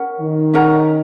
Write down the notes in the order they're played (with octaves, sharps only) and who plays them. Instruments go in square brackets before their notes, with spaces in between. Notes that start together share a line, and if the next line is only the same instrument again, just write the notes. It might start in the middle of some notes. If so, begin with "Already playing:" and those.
Already playing: [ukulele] C#4 A#4 F#5
[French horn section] D#3
[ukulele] C#4 A#4 F#5 A#5